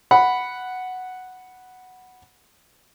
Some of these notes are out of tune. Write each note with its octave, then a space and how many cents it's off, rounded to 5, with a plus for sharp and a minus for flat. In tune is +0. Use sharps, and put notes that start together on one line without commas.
F#5 +0 B5 +0